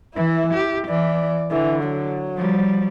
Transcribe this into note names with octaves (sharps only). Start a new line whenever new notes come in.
E3 E4
G4
E3 D5
D3 E3
F#3
F3 G3